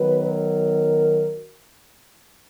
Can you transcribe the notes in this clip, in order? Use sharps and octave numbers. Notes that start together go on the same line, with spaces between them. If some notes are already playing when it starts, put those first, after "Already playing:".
Already playing: D#3 F#3 B3 B4
A#4